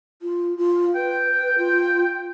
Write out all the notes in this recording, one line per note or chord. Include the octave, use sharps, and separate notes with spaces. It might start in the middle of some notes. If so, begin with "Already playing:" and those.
F4
F4
B4 G5
F4